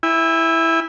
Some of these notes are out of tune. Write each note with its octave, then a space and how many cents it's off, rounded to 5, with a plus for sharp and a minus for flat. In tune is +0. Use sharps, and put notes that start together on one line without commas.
E4 +0 G#5 -45